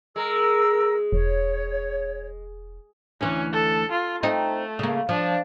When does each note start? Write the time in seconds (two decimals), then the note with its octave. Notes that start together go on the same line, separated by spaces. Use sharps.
0.16 G#3 A#4 E6
1.13 E1 C#5
3.21 D2 E3 C#4
3.53 A4
3.91 F4
4.23 A3 C4 D#4
4.79 C#3 A#3
5.09 F3 D4